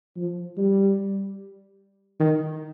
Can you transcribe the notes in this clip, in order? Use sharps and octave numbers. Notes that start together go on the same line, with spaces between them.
F3
G3
D#3